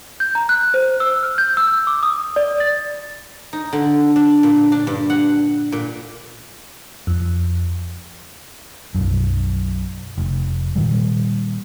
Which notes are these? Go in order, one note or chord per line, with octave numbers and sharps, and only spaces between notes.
G6
A#5
F#6
C5
E6
F6
G6
E6
D6
D#6
D5
A6
D#4
D3
D4
A#2
D4
G2
F#5
A#2
F2
B1 F#2
F1
A#2 D#3 G3